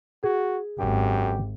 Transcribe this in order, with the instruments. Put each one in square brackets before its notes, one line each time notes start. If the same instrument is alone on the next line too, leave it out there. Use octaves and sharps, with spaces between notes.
[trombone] F#4 [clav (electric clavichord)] G#4
[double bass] G#1 [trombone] F#2 [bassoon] G4